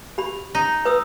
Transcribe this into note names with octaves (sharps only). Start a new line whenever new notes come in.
G4 B5
D#4
B4 D#6 E6